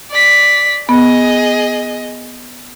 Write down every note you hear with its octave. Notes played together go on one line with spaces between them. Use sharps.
D5 B6
B3 G#4 D#5